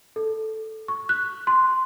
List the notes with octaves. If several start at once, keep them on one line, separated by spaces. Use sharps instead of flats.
A4
C#6
F#6
C6